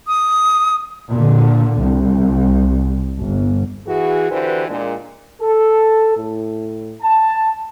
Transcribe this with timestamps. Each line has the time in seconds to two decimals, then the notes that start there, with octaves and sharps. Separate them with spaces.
0.07 D#6
1.10 A#2 D3
1.80 C2
3.20 G1
3.87 E3 F#4 G#4
4.30 D3 E3 F#4 G4 B4 C5
4.68 A#2 G#3 D4
5.41 A4
6.17 A2
7.02 A5